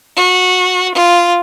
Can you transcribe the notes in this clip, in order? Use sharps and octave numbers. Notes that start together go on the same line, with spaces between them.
F#4
F4